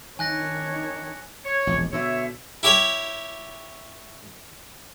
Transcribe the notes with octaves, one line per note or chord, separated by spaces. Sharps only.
D#3 D4 C#5 G#5 F#6 A#6
C#5
E1 A#1
B2 D3 C#5 E5
E4 G4 C#5 G5